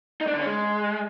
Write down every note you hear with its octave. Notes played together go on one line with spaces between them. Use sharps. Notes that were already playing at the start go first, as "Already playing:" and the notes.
D#4
D4
D3
C#4
G#3